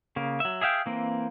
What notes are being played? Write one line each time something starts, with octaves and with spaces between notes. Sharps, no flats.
C#3 A#3
F#3 E5
G#4 E5 F5 G5
E3 A#3 C4